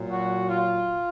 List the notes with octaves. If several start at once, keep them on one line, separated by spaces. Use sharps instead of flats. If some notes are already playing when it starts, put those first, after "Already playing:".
Already playing: A#2 F#3
F#4
F4